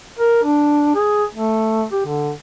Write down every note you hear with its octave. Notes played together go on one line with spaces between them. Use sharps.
A#4
D4
G#4
A3
G4
D3